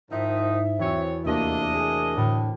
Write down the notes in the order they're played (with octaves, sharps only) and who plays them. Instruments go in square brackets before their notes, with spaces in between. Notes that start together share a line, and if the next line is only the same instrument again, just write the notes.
[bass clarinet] G#2 [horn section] D#3 F3 D#4 [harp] E4 D#5 [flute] E5
[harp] E2 F#4 E6 [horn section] C4 C#5
[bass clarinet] D#2 [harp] C3 A3 A#3 [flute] D4 [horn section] E4 A#4 D#5
[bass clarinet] G#4
[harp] D2 [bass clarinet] A2